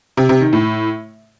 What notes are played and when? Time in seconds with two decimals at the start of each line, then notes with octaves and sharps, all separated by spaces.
0.17 C3
0.29 C3
0.41 D#3
0.53 A2